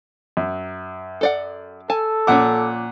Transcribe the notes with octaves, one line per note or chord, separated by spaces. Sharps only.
F#2
A4 D5 F#5
A4 G#5 A5
A#2 F3 C#4 F#5 D6